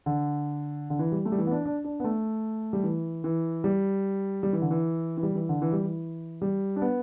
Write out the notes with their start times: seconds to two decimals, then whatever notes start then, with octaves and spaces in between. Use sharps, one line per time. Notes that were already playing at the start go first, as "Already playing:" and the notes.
0.06 D3
0.90 D3
0.99 E3
1.12 G3
1.25 A3
1.32 G3
1.38 E3
1.47 B3
1.51 D4
1.65 D4
1.84 D4
2.00 B3
2.04 A3
2.73 G3
2.83 E3
3.24 E3
3.64 G3
4.43 G3
4.53 E3
4.62 D3
4.71 E3
5.17 E3
5.23 G3
5.35 E3
5.49 D3
5.62 E3
5.73 G3
5.83 E3
6.42 G3
6.76 D4
6.82 B3